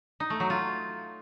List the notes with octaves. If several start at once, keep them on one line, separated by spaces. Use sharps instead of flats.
D#4
A3
F#3
F4